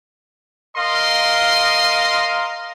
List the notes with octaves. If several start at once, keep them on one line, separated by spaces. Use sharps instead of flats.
A#4 D#5 F5 C6